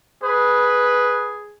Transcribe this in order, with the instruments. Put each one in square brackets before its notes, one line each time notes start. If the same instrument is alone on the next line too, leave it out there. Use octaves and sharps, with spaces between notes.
[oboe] G#4 [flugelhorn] B4